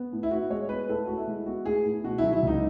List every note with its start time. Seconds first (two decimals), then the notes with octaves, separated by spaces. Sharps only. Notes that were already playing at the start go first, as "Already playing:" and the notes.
Already playing: B3
0.12 A2
0.23 E4
0.31 A2 F#4
0.50 G#3 C#5
0.69 B3 B4
0.89 A2 A4
1.07 A2 F#4
1.18 E4
1.27 G#3
1.46 B3 F#4
1.65 A2 G#4
1.85 A2
2.04 B2 F#4
2.18 F#3 E4
2.33 E4
2.43 C#2 D#4